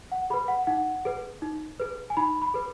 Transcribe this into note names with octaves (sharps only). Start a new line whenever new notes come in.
F#5
G#4 B4 B5
F#5
D#4 F#5
G#4 B4
D#4
G#4 B4
G#5
D#4 B5
B5
G#4 B4